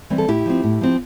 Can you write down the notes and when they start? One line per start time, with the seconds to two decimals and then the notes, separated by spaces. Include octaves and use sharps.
0.10 E3 G3 C4
0.18 A4
0.28 A2 E4 G4
0.46 F3 C4
0.64 A2
0.81 F3 C4